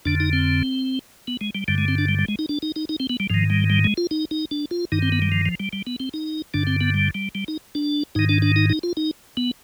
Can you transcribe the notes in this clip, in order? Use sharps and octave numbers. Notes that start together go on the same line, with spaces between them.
F2 D3 D4
D#4
C4
B3
G#3
G3
G2 D3 G3
G#3
C4
D4
G3
G3
G#3
D#4
D4
D#4
D#4
D#4
C4
B3
G3
G#2 D#3 F3
G3
G3
G#3
F4
D#4
D#4
D4
F4
G2 D#3 D#4
C4
B3
G3
F3
F3
G3
G3
B3
C4
D#4
G2 D3 D4
C4
B3
G3
G3
G3
D#4
D4
G#2 D#3 D#4
D4
D4
D#4
D#4
F4
D#4
B3